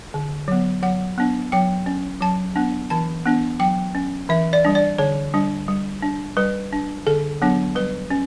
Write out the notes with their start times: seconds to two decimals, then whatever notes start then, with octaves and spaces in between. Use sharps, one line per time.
0.14 D3
0.48 F#3 B3
0.83 F#3 F#5
1.18 B3 D4
1.52 F#3 G5
1.86 C#4
2.21 F#3 A5
2.56 B3 D4
2.90 E3 A5
3.26 B3 D4
3.59 F#3 G5
3.95 C#4
4.29 E3 E5
4.53 D5
4.65 G3 D4
4.75 D5
4.98 D3 C#5
5.34 G3 D4
5.68 G3
6.02 D4
6.37 G3 B4
6.73 D4
7.07 D3 A4
7.42 F#3 B3 D4
7.75 G3 B4
8.10 C#4